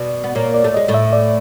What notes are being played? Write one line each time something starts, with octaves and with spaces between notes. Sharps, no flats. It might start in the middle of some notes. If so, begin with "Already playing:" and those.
Already playing: B2 D5
B3
A#2 A#3 C#5
D5
A3
G#3 D#5
A2 A3
E5
D5